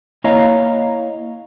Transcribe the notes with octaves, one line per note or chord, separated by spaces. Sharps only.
A#3 E4 C#5 D#5 F5 A#5